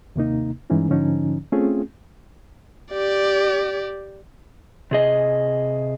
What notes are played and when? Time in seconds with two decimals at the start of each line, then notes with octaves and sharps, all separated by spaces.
0.16 D#2 C3 A#3 D#4
0.70 G2 E3 G#3 C#4 D#4
0.89 G#2 D3 F3 C#4 D#4
1.52 A3 C4 C#4 F4 G#4
2.93 G4 D5
4.91 C3 G#4 D#5